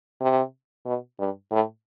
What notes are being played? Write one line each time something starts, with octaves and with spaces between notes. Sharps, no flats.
C3
B2
G2
A2